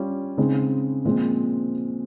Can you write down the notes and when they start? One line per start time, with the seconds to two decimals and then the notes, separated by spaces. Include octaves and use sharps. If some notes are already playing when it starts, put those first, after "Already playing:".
Already playing: G3 C#4 F4
0.38 C#3 G#3 C4 D#4
1.05 A#2 F3 G#3 C4